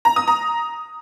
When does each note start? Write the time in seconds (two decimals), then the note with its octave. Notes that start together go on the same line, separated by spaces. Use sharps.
0.05 A#5
0.16 D#6
0.28 A#5